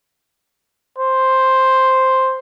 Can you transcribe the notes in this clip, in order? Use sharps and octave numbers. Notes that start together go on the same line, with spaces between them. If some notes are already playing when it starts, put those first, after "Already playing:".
C5